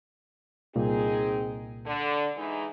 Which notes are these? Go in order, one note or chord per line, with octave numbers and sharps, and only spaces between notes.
C2 A#2 C4 D#4 G#4
D3
E3 G#3 D#4